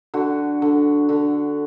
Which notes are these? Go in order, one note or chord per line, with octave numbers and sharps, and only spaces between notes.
D3 F#4
D3
D3